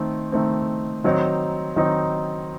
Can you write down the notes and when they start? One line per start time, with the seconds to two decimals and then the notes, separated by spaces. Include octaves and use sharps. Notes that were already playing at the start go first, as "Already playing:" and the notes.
Already playing: D#3 A3 C4
0.32 D#3 A3 C4
1.04 D#3 F#3 C4 D#4
1.76 D#3 F#3 C4 D#4